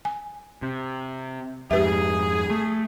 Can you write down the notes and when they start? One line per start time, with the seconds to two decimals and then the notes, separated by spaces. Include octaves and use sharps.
0.05 G#5
0.62 C3
1.71 F2 G#2 G4 G#4 B4 E5
2.50 A3